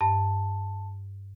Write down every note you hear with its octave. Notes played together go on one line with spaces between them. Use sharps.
G2 A5